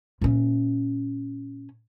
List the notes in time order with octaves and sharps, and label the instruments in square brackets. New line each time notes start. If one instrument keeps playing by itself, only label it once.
[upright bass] A#2 C#4